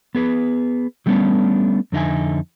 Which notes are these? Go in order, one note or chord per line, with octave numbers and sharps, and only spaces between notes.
B3 G#4 B4
F#3 G3 A3 B3 C#4 D4
F2 D3 D#4 E5 G#5